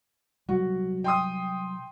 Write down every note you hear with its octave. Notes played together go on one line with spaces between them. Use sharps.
C3 F#3 G3 F#4
G5 C6 D#6